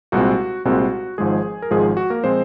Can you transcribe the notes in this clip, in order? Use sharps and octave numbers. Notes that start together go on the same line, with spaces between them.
C2 A#2 G#3 C4 F#4
C2 A#2 G#3 C4 F#4
G#1 G#2 F3 G#3 G#4
A#4
G#1 G#2 F3 G#3 G#4
F#4
A#3 A#4
A#2 F3 G#3 C4 C5